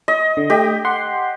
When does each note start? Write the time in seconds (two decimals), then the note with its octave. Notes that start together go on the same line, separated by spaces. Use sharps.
0.08 D#5
0.37 D3
0.50 A3 G4 D#5 G5
0.85 F#5 C6